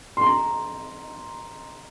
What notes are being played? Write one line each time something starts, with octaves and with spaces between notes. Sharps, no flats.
C6
A#5